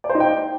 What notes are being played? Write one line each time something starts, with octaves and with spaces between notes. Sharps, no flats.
D5
C5
D#4
G5